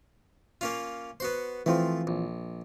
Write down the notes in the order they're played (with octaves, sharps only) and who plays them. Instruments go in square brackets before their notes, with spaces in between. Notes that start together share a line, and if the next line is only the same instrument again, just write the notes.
[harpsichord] A#3 C#4 F4
B3 F#4 C5
[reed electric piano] E3 C4 F4 [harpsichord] F3 A3
[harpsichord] A#1